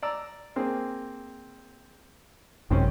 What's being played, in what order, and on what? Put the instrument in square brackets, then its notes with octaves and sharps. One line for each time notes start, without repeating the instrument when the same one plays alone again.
[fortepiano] D5 A#5 E6
A#3 C4 G#4
[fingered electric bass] G#1 F#2 C3 [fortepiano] D#3 C4 C#4